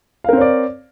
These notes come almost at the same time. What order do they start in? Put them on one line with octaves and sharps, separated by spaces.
F5 A#4 C4 C#5 D5